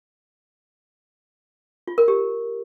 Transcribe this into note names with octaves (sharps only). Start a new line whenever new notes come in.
F4
A#4
G4